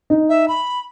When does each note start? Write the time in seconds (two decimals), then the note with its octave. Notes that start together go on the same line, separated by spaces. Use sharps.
0.10 D#4
0.29 E5
0.48 B5